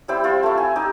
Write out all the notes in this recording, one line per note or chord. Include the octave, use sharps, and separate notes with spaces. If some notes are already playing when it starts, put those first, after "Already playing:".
G3 C4 E4 G5
C4 F4
A3 E4
G#5
D#4 G4